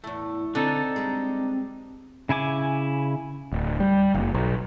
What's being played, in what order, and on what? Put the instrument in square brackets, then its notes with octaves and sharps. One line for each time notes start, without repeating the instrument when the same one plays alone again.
[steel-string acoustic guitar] E2 A2 [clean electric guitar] A3
[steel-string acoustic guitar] D3 [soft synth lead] C4 [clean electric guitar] D4 D#4 A4
[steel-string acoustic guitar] G3 G#3
[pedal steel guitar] C#3 E4 G#5 D6
[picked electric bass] D1
G3
F#1
B1